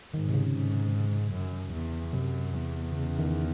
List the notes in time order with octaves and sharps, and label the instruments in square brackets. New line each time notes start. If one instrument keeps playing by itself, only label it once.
[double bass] G#2 [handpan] D#3
[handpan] C3
C#3
[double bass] G#2
F#2
E2
[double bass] F#2 [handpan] C3
[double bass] E2
[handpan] C#3
D#3